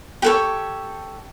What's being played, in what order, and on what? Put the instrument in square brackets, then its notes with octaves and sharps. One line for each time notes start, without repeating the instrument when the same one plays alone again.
[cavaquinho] G4 A4 C#5